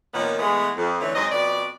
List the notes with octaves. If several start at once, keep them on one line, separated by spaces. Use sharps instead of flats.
A#2 D#3 F3 B3 C#4
E3 G#3 A3 B3
F2
D3 E3 A3 C4 C#4
G#2 F#3 C4 D#5
F2 B2 B4 D5